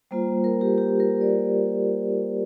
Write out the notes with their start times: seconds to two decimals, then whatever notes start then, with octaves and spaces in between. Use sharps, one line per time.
0.11 G3 A#3 F4 C5
0.44 A#4
0.61 G4
0.78 G4
1.00 A#4
1.21 D5